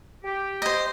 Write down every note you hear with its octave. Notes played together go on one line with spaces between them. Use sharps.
G4
C5 D#5